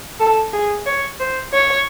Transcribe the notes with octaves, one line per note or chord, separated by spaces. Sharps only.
A4
G#4
C#5
C5
C#5